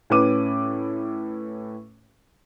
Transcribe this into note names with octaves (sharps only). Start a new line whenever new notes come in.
A2 C#4 B4 D6 D#7